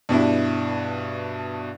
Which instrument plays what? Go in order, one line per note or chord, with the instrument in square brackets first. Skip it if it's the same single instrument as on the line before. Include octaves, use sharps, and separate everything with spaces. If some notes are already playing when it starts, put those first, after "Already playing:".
[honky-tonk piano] G2 B2 D4 E4